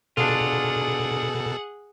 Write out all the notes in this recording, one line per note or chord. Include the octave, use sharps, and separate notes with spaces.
B2 D4 F4 G#4 A4 F#5